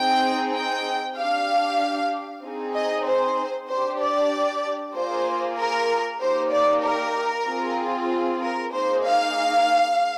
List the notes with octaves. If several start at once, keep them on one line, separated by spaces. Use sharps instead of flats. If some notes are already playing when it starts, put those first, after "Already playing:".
Already playing: C4 D#4 G#4 G5
G5
D4 G4 F5
C4 D#4 G#4
D#5
C5
D4 G4 C5
D5
A#3 F4 G#4 C5
A#4
A#3 D#4 G4 C5
D5
A#4
C4 F4 G#4
A#4
A#3 D#4 G#4 C5
F5